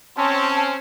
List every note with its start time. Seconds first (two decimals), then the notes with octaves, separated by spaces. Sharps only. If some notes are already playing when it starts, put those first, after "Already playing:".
0.18 C4 C#4 A5